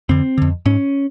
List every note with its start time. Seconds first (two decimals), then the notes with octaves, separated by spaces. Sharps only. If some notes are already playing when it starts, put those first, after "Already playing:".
0.09 F2 D3 C4
0.38 F2 D3
0.66 G#2 C#4